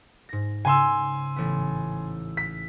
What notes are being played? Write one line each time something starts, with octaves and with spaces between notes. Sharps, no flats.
G#2 A#6
C#3 G#5 C6 E6
A1 B3
B6